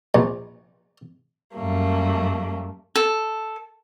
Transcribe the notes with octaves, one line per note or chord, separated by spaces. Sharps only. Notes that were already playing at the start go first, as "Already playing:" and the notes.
A#1
F#2 G3 A3 A#3
A4